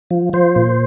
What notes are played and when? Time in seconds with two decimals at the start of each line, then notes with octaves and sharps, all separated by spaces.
0.11 F3
0.33 F3 C5
0.56 A#2